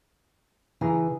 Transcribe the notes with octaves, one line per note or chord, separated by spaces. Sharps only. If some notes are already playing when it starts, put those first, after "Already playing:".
C#3 E3 G#4 A#5